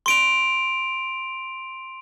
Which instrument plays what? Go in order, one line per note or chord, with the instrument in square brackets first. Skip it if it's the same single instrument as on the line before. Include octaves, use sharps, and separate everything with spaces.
[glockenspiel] C6 D7 F7